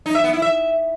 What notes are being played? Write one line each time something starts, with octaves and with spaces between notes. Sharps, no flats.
D#4
E5
B3
E4
E5